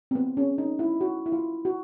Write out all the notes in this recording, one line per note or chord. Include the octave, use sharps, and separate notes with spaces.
C4
B3
C#4
D#4
E4
F#4
E4
F4
F#4